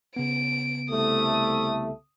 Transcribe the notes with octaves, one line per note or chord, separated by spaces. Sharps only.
C#3 B3 D7
C2 A3 D#6